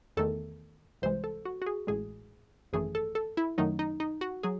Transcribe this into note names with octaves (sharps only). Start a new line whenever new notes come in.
E2 D#3 A3 A4
C2 C3 E3 G#3 C5
A4
F#4
F#4
G#4
A1 A2 G#3 G#4
G#1 F#2 E3 A3 G#4
A4
A4
E4
F#2 D#3 F#3 A3 D#4
D#4
D#4
F#4
F#3 G#4